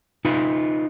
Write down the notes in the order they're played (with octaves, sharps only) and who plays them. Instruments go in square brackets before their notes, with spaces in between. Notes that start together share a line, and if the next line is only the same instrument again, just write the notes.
[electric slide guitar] D#4 F4 B4